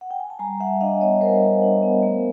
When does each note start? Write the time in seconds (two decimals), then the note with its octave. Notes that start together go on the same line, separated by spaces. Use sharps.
0.01 F#5
0.11 G5
0.20 G#5
0.30 A5
0.39 G3 G#5 A#5
0.60 G3 E5 F#5
0.81 D4 D#5 F5
1.01 B3 C#5 D#5
1.21 G3 A#4 C5
1.42 G3
1.62 D4
1.82 B3
2.03 A3